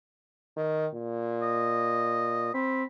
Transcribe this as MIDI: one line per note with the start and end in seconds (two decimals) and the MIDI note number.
0.57 0.87 51
0.94 2.53 46
1.42 2.51 75
2.54 2.84 60
2.54 2.83 83